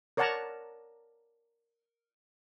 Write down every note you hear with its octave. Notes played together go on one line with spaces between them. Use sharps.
A#4 C#5 D5 F#5 A5 A#5